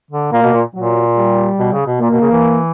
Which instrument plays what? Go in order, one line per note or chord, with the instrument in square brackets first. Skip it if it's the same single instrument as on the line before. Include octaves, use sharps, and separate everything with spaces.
[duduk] D3
[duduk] A#2 [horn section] A#3
[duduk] B2
A#2
[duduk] A#2 [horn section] F#3
[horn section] G3
[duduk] B2
C#3
B2
[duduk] A#2 [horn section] A#3
[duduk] B2
C#3
E3